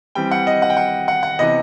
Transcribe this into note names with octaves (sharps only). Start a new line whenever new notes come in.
E3 G3 C4 G5
F#5
D#5
F#5
G5
F#5
F#5
F#5
C3 E3 B3 D#5